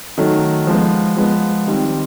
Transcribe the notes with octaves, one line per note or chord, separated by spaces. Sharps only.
D#3 F#3 A3
F3 G#3 B3
F3 G#3 B3
D#3 G3 C4